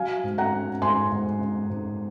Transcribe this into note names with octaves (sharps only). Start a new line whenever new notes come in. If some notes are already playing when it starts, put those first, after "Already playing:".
Already playing: F#3 F5 G#5
G#2
F#5 A#5
C#4
G#2 G#5 C6
G#2
G#2
G#2